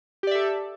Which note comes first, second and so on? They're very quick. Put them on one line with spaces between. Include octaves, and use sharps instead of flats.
G4 D5 E5 A4